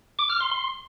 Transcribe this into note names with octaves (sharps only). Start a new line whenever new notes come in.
D6
F6
C6
C6